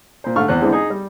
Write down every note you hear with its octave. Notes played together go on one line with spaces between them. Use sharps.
A#2 C5
G#2 D3 A3 F5 C#6 F6
E2 C4 F#6
D3 E3 G#3 C4 D4 E4
D#4 G#4
G3